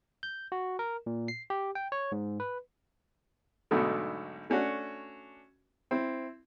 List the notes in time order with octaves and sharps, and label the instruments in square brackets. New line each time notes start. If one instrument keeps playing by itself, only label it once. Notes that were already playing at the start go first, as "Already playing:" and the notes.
[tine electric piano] G6
F#4
A#4
A#2
C7
G4
G5
C#5
G#2
B4
[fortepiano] B1 G#2 B2 D3 A3
A3 C#4 D4 F#4
C4 E4